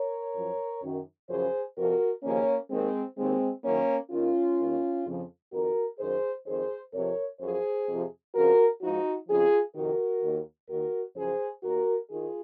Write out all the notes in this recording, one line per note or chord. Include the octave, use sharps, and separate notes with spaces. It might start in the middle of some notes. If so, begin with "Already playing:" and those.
Already playing: A#4 C#5
F#2 F3
F#2 D#3
F#2 C#3 F3 G#4 C5
F2 C3 F3 F#4 A#4
D#2 C#3 F3 A#3 C#4
D#2 D#3 G#3 C4
D#2 D#3 G#3 C4
F#2 D#3 A#3 C#4
D#2 D#3 C#4 F4
D#2 D#3
F2 C#3 F3
F2 D#3 F#4 A#4
F#2 D#3 G#4 C5
F2 D#3 G#4 C5
F2 C3 F3 A#4 C#5
F#2 F3 G#4 C5
F2 C3 F3
F2 C#3 F3 F#4 A#4
G#2 F3 D#4 F#4
F2 C#3 F3 F4 G#4
F2 C3 D#3 F#4 A#4
D#2 D#3
D#2 D#3 F#4 A#4
F#2 C#3 F3 G#4 C5
D#2 D#3 F#4 A#4
D#3 F4 G#4